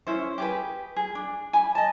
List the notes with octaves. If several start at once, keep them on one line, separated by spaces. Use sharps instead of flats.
C#4 E4 C5
G4 G#4 B4
G#4
D4
G#5 B5
D#5 A5